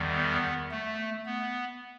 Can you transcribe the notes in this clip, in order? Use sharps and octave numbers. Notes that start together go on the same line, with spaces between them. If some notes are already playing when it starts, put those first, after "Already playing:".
Already playing: E2 D#3 G3
B3
A3
B3